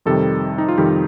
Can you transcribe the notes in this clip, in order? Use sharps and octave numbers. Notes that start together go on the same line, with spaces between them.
F2 C3 D#3 G3 A4
D#4
F4
F2 C3 D#3 G3 G4